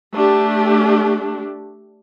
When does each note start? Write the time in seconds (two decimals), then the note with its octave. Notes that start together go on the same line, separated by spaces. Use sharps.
0.14 A3 D4 G4